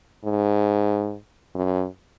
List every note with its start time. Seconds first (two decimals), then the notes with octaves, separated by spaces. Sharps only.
0.24 G#2
1.55 F#2